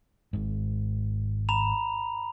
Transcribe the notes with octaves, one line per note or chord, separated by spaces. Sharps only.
G#1 G#2
A#5 B5 F7